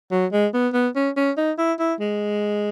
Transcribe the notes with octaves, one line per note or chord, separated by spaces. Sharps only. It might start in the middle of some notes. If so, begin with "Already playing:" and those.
F#3
G#3
B3
B3
C#4
C#4
D#4
E4
E4
G#3